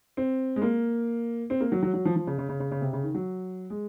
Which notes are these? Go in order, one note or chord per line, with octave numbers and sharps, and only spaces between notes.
C4
G#3
A#3
C4
A#3
F#3
F#3
F#3
F3
F3
C#3
C#3
C#3
C#3
C#3
C3
C#3
D#3
F#3
G#3